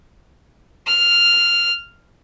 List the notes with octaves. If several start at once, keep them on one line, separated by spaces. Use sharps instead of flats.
F6